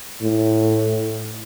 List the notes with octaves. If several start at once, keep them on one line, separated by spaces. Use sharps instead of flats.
A2